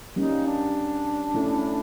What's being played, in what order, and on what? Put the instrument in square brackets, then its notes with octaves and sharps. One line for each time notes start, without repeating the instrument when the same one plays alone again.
[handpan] G3 A#3 C#4 [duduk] D#4
[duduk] D4
[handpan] A3 C#4 E4 A4